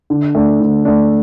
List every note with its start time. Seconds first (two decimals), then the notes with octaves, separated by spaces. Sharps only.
0.10 D3
0.35 A3 D4
0.60 D3
0.85 A3 D4